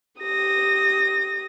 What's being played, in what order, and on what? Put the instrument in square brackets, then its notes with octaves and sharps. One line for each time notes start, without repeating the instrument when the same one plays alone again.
[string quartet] G4 D#6 A#6